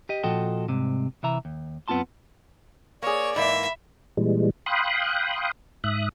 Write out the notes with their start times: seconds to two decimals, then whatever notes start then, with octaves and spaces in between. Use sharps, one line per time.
0.09 G4 D#5
0.23 A#2 F3 F#4 A4 D#5 G5
0.69 C2 G#2 C3
1.23 C3 E3 E5 A#5
1.45 D#2
1.88 F#2 B3 C4 F4 A5 C6
3.02 A#3 G#4 C#5 D5 C#6
3.36 G#2 E3 A#3 E5 B5
4.17 A#2 E3 G3 G#3
4.66 F5 G5 B5 C6 D#6 F#6
5.84 G#2 E5 D#6 F#6